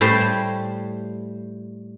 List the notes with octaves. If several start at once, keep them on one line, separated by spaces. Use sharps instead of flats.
A2 G3 C5 C6